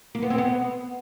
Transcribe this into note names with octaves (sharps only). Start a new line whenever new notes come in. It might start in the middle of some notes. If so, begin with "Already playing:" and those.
A#3
B3
C4
B3